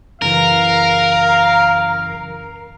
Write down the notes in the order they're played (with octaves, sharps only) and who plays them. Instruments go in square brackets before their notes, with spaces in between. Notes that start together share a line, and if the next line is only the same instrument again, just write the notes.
[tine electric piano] F#2 C#3 E3 [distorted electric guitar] A#4 [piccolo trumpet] F5